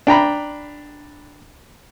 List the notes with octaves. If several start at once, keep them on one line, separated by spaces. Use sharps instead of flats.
D4 G5 A#5 B5